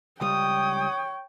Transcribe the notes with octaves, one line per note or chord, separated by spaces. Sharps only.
C#2 G3 C#5 G5 D#6